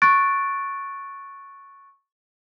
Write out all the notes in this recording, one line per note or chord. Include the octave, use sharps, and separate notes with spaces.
C#6 F#6 A6 D7